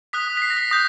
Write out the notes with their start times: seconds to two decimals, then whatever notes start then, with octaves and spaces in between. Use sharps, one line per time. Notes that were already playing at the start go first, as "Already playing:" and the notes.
0.13 D#6 F#6 B6
0.37 B6
0.42 C7
0.50 A#6
0.57 B6
0.71 D#6 G6 A#6